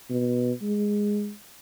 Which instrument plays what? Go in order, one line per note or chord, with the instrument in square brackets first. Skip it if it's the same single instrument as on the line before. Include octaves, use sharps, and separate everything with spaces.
[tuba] B2
G#3